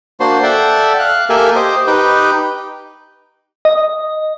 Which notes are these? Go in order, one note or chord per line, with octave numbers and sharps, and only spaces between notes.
A#3 D4 F#4 C5 C6
A4 D5 E5 F#5 G5
F5 F#6
A#3 G4 A4 A#4 E5 G#5
G4 C5 D#5
D#4 G4 B4 G5
D#5